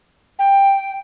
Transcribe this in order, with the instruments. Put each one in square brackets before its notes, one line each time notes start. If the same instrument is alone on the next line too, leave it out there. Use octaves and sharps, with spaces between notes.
[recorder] G5